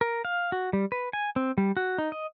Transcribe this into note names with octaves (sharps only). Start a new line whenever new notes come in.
A#4
F5
F#4
G3
B4
G#5
C4
G3
F#4
D#4
D#5